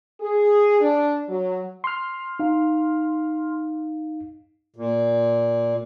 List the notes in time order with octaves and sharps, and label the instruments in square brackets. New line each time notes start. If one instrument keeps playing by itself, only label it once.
[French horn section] G#4
D4
F#3
[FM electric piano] C6 F6
[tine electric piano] D#4 F5
[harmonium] A#2